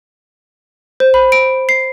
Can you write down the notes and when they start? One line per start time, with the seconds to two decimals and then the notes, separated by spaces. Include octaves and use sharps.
1.00 C5
1.14 B5
1.32 D7
1.69 C7